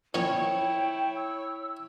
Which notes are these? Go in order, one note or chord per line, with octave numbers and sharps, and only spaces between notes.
A#2 F3 C#4 E4 C#5 G5
E6